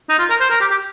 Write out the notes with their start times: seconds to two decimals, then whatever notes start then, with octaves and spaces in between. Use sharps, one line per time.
0.09 D#4
0.19 F4
0.30 A#4
0.40 C5
0.51 A#4
0.61 G4
0.71 G4